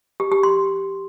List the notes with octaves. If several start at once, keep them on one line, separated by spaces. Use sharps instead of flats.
G4
G4
C6